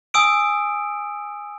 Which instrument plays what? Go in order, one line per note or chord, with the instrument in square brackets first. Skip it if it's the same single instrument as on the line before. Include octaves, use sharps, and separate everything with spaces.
[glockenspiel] G#5 D#6 E6 D7